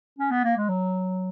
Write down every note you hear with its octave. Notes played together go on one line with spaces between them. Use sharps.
C#4
B3
A#3
G#3
F#3